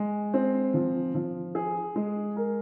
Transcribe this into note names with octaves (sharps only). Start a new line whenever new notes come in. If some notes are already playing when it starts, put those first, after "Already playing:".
Already playing: G#3
C4
F3
F3
G#4
G#3
A#4